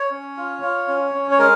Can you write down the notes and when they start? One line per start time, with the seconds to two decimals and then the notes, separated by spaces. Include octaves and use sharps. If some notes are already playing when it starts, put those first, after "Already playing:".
Already playing: C#5
0.11 C#4
0.37 F4
0.63 F4
0.88 C#4
1.14 C#4
1.31 C#5
1.39 G#3 A#4